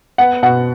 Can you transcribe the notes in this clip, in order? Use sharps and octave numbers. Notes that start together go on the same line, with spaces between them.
B3 F#5
B2 F#5